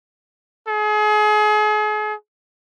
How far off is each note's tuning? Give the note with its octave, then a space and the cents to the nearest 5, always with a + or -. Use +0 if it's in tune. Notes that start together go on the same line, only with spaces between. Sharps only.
G#4 +35